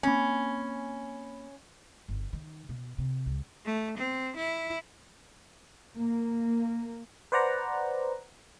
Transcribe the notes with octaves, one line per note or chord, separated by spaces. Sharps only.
A#3 C4 C#4 G#5 B5
G1
D#3
B2
C3
C#2
A3
C4
E4
A#3
B4 C5 D5 F#5 A#5